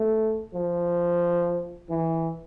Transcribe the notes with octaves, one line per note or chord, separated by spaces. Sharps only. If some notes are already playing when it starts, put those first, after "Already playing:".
Already playing: A3
F3
E3